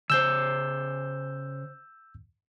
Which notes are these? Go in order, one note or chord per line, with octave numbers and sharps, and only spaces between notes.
C#3 C5 E6 G6